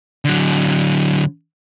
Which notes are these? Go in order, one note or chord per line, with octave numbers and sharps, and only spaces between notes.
D3 F#3